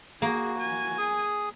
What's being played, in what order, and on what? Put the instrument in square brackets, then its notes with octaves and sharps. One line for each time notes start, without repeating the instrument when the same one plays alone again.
[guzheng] A#3 [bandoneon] F#4 [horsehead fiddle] G#4
[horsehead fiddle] G#5
[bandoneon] G#4 D#6